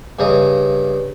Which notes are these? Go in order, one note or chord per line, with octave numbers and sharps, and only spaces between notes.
G2 C#3 D#5 A#5